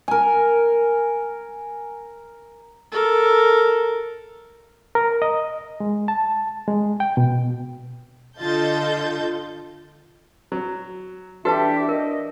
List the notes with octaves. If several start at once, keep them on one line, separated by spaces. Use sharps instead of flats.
A#4 G#5
A4 A#4
A#4
D#5
G#3
A5
G#3
G5
B2
D3 F4 A4 D#5 G6 A6
F#3
E3 D4 F#4 G4 A4 B4 E5 A5
A#4 D#5